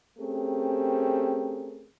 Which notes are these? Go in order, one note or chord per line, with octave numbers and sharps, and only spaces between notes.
A3 C4 C#4 G4 G#4 A#4